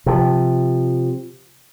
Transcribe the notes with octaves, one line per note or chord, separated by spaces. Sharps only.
C3 F3